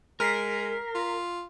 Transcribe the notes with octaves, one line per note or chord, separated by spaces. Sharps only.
G#3 A#4 F6 B6 C7
F4